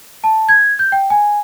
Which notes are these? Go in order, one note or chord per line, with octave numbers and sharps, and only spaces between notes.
A5
G#6
G6
G5
G#5